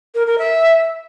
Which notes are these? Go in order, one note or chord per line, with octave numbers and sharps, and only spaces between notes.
A#4
A#4
E5